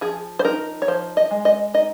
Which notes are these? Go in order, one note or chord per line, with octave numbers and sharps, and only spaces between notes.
F3 G#4
C5
D#4 A#4
C#5
F3 C5
D#5
G#3
D#5
D#4 D#5